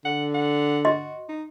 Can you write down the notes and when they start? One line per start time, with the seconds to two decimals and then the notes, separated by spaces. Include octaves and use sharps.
0.05 D3 F#5
0.34 F#5
0.85 F#4 D#5 C6
1.29 D#4